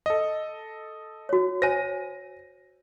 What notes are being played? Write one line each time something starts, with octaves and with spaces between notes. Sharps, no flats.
A4 D#5
F#4 C#5
C5 C#5 G#5 A#6 D#7